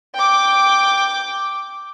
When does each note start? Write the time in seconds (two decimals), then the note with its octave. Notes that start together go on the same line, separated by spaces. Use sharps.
0.14 G5 D6